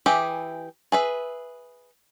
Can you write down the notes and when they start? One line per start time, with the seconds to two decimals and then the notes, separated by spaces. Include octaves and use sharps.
0.06 E3 G4 G#4 E5
0.92 G#4 B4 E5